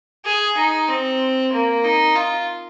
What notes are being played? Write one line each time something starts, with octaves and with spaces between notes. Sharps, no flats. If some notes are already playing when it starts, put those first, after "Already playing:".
G#4
D#4
C4
A#3
D#4
F4